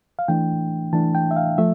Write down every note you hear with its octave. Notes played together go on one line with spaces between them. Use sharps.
F5
E3 A3 D4 G5
E3 A3 D4 A5
G5
E5
F5
F3 A3 E5